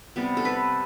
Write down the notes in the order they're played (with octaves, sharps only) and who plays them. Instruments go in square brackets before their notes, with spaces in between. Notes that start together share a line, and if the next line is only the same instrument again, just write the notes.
[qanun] C3 G3 B3
A4
B4